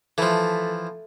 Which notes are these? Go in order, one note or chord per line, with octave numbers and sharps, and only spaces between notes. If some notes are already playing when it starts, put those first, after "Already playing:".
E3 F3 A3